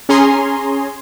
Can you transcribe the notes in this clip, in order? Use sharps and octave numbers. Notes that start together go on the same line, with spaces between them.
C#4 G#4 G#5 A#5 C6